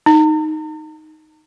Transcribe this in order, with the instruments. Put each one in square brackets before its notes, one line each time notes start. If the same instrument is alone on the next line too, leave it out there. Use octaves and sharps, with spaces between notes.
[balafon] D#4